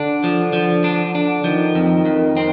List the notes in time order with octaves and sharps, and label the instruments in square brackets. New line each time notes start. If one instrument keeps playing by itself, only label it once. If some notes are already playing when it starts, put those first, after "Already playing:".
Already playing: [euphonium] D3 [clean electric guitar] D4
[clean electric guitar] F3
F3
D4
D4
[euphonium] D#3 [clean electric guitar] F3
[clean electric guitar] F2
F2
C4